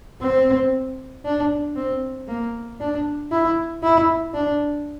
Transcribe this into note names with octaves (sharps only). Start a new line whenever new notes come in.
C4
D4
C4
A#3
D4
E4
E4
D4